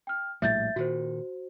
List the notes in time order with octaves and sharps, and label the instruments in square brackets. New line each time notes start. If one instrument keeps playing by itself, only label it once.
[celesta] G5 F6
[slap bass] A#1 A2 G3 [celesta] E5 G6 A6
[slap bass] A#2 D#3 [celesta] F#4 C5